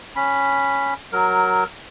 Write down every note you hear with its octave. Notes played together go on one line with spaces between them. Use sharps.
C#4 B5
F#3 A#4